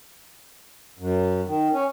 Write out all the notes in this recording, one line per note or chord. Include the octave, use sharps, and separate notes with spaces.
F#2
D#3
C#4